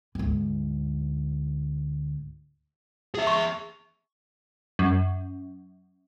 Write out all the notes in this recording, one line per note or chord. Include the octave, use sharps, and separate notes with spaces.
D2 G#2
G#4 E5
C#6
F#2